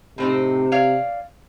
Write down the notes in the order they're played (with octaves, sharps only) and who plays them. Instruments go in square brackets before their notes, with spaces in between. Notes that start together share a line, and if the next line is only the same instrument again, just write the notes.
[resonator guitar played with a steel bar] A2 C4 D#4 [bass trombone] C3
[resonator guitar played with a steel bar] C#5 D5 F5